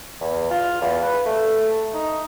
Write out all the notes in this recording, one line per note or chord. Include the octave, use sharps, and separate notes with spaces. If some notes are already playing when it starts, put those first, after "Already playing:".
E2
F4
E2
B4
A3
D#4